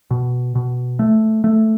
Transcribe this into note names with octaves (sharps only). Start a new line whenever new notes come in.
B2
B2
A3
A3